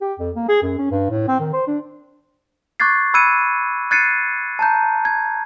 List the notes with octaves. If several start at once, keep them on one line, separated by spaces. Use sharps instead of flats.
G4
F2
A#3
G#4
F#2
C#4
G2
A2
C4
D#3
C5
D4
C#6 D6 F#6 G#6 A6 C7
B5 E6 F#6 G#6 C#7 D#7
F#6 G#6 A6 C7 C#7 D#7
A5 A#5 G6
G#6